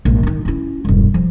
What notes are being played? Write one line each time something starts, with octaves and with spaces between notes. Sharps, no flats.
A#1 G#2
D#3 D#4
C#4 E4
E1 G2
F3